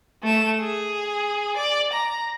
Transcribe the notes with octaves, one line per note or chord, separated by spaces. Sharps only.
A3 E7
G#4
D5
A#5